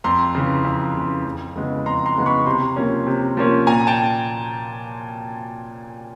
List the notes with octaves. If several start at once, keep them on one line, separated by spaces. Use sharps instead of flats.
F2 A#5 C6
C#3 E3
F2
C#3 E3
F2
C#3 E3 G#3 B3
F2 A#5 C6
A#5 C6
C#3 E3 G#3 B3
B5 C#6
C3 A#5 C6
F3 A#3 C#4
C3
F3 A#3 C#4
A#2 G#5 A#5
G5 A5